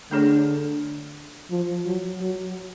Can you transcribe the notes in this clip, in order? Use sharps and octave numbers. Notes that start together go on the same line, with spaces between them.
D3 A3 D4 G#4 C#5
F3
F#3
F#3